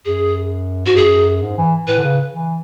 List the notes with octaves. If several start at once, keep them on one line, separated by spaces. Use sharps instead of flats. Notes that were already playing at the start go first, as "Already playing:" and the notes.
F#2 G#4
G#2 F#4
F#2 G#4
G#2
E3
A2 B4
D3
C#3
E3